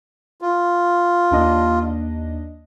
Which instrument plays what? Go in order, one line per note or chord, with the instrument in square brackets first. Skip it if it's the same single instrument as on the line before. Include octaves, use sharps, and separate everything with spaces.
[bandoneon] F4
[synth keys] D#2 D4 D#5